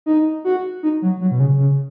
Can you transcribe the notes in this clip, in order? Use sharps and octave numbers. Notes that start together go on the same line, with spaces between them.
D#4
F#4
D#4
F#3
F#3
B2
C#3
C#3